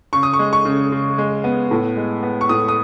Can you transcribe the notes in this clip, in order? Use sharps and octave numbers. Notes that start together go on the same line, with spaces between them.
C#3 C#6
D#6
C#6
G#3
C#6
C#3
C#3
G#3
B3
A2
G#3
B3
C#6
A2 D#6
D#6